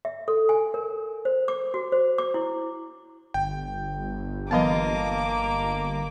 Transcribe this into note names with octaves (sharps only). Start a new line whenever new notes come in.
E5
A4
G#5
A#4
C5
D6
F#4
C5
D6
E4
G1 G5
E3 F#3 A#3 B3 D#5 F5 A5 D6